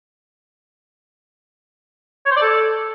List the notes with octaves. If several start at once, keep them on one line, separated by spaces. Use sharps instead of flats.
C#5
C5
D5
A4